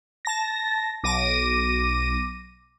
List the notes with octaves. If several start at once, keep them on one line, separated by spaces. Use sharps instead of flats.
A5 A#6
B1 D6 A#6 D#7